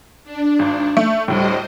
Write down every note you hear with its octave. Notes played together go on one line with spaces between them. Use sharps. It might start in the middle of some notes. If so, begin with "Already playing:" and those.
D4
G#1
A3
D2 A2 G3 C5 D#5